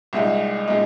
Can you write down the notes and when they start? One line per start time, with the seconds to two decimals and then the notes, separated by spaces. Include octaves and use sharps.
0.13 C2 A#2 G#3 D#4
0.68 A#2 G#3 D#4